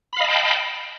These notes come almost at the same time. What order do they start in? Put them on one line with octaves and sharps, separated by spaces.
B5 F5 D#5 A5 G5